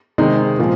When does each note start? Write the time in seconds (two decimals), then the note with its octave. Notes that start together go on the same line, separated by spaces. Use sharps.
0.18 C3 D#3 G#3 D#4
0.59 A#2 F3 G#3